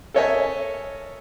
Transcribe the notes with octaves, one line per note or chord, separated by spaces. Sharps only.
A4 A#4 C#5 D#5 E5 G#5